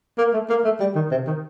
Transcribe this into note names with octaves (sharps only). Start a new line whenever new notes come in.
A#3
A3
A#3
A3
G3
D#3
C3
D#3